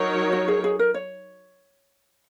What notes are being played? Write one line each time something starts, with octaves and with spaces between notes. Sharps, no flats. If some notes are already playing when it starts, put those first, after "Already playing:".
Already playing: F#3 D#4 A#4 C#5
F#4
G#4
G#4
A#4
C#5